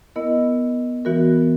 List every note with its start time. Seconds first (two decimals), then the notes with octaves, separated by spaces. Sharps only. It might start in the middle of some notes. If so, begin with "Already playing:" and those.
0.16 B3 E4 A#4 D#5
1.05 E3 B3 F#4 A#4